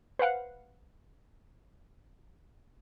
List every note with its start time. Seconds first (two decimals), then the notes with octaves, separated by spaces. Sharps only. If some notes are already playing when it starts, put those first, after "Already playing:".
0.19 B4 C5 F5 F#5